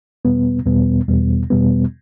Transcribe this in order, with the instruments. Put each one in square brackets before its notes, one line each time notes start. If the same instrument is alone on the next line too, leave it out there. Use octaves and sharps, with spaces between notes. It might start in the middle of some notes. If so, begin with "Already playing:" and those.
[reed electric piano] E2 B2 G3 B3
E2 B2 G3 B3
E2 B2 G3 B3
E2 B2 G3 B3